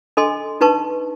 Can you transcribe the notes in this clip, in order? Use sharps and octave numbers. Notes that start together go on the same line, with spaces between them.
D4 A4 D#5 G#5 C6
D4 D#4 B4 A5 C#6